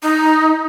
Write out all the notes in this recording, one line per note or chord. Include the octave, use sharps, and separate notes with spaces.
D#4